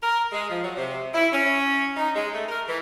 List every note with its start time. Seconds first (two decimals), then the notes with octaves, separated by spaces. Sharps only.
0.02 A#4
0.32 G#3
0.49 F3
0.63 F#3
0.76 C3
1.14 E4
1.32 C#4
1.97 D#4
2.15 G#3
2.33 A3
2.48 A#4
2.67 E3